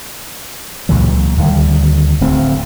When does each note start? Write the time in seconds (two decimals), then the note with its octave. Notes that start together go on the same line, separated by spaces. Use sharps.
0.89 C#2 A#2 E3 F#3
1.38 D2 D#3 G3
2.21 D1 D2 A3 C4